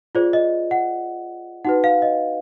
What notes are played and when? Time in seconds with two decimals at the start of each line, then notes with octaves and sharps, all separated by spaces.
0.15 F4 G#4 C5 D5
0.33 D#5
0.71 F#5
1.65 D#4 F#4 B4 F#5
1.84 F5
2.02 D#5